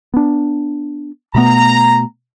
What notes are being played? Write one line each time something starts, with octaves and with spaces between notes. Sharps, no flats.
B3 D4
B2 A3 B3 A#5